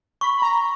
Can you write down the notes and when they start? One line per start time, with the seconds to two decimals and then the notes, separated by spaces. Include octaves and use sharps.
0.21 B5 C#6
0.37 B5
0.42 A#5